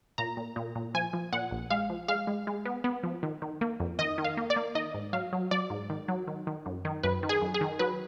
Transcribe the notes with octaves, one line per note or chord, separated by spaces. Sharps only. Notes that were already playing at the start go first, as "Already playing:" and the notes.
A#2 A#5
A#2
A#2
A#2
F3 G#5
F3
A#2 F#5
A#1
G#3 F5
F3
G#3 F5
G#3
G#3
B3
B3
F3
D#3
D#3
A#3
F2
D#3 D#5
D#3
F5
A#3
D5
A#3
D#3 D#5
G#2
F#3 F5
F#3
F#3 D5
G#2
D#3
F#3
D#3
D#3
F#2
D#3
F#2 B4
D#3
G#4
F#2
G#4
D#3
F#3 B4